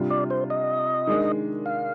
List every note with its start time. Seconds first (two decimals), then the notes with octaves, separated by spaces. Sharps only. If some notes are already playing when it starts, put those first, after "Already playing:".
Already playing: C3 G3 D4 F4
0.10 D5
0.30 C5
0.50 D#5
1.07 D#3 G#3 D4
1.66 F5